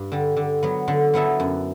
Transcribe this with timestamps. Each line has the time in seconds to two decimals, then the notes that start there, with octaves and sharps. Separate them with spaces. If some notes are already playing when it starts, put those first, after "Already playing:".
Already playing: G2
0.12 D3 G3
0.37 D3
0.63 F#3 B3
0.88 D3
1.14 F#3 B3 E4 A4
1.40 F#2